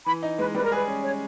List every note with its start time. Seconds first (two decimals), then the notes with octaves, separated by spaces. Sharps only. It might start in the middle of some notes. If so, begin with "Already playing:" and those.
0.06 E3 B5
0.23 D#4
0.39 G#3 B4
0.55 G3 B4
0.64 A#4
0.72 G#4 B4
0.87 C#4
1.03 C#5